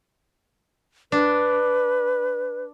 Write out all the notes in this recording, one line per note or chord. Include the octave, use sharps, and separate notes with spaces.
D4 B4